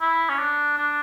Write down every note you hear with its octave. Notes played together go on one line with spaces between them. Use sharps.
E4
C#4
D4
D4